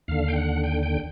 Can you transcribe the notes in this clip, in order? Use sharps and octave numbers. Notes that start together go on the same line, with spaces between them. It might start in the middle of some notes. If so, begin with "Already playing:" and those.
D#2 D3 F5
G5
F#5
G5
G5